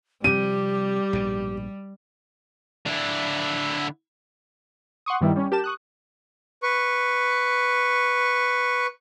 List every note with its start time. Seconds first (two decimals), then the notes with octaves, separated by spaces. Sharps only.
0.24 C3 F3 G3 C4 G4 D#7
1.13 A#1 G#2 B2
2.86 D3 E4
5.06 F#5 C6 C#6 D#6
5.21 G2 D#3 G3 B3 E4
5.36 G3 C#4
5.52 G4 A#4 A5 E7
5.64 C#6 D#6 F#6
6.63 B4 C#6